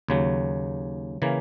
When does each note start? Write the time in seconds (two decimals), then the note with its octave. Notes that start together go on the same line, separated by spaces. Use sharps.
0.08 D#2 C#3 F#3
1.22 C#3 E3 A#3